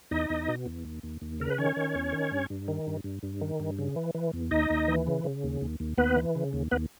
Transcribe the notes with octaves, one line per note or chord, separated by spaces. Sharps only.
E2 D#4 D#5
E2
B2
E2
D#2
D#2
D#2
C#3 A#4
B4
D#3 C#4 C#5
D#3
E2
D#3
G2
G2
D#3
G2
G2
G2
D#3
G2
C#3
E3
E3
E2
D#2 D#4 D#5
D#2
E3
C#3
C#3
D#2
D#2
D#2
D#2 B3 B4
E3
C#3
D#2
D#2 B3 B4